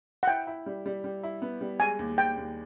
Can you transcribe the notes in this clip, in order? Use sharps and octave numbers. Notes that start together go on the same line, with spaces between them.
F#5
E4 G5
E4
G3
G3
G3
E4
B3
G3
G#3 G#5
D#2
D#2 G5
D#2